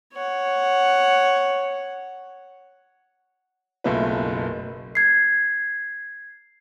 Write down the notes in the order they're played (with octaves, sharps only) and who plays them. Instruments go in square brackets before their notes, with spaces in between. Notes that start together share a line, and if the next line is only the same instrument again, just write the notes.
[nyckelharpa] C#5 F#5
[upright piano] F#1 B1 F#2 A3 F4 B4
[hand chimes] G#6 C7